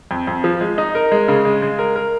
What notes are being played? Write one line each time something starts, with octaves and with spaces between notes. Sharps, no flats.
F2
F2
F3
G#3
D#4
A#4
G#3
C#3
G#3
G#3
A#4
A#4